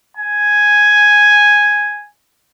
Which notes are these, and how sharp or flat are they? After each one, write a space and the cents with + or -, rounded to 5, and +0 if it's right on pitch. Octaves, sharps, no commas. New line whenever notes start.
G#5 +0